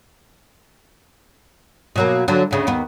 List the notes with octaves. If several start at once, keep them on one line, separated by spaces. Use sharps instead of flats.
B2 F#3 A#3
D3 F#3
D2 C#3
D#2 B3